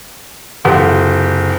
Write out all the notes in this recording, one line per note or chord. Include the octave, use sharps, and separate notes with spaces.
F#1 C3 F4 G4 A4 F#5